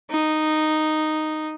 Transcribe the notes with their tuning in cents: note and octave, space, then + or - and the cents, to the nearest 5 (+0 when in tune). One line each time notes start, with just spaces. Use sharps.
D#4 -5